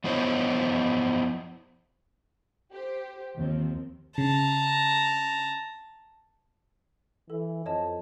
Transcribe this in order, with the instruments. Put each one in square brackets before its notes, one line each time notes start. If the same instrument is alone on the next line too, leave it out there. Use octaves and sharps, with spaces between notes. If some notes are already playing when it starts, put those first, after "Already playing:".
[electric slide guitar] F3 B3 D#4 E4 C5 C#5
[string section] G4 C5
D#2 D#3 F3 C4
[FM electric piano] C#3 [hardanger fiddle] A5 A#5
[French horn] E3 [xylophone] A4
[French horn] F2 [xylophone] C#5 D#5 A5